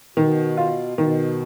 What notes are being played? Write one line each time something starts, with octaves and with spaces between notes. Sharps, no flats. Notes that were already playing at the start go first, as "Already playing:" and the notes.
B2 D#3
F4
B2 D#3